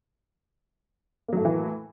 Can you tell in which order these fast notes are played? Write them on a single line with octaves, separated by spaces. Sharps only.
A#3 F#3 A3 A2 E3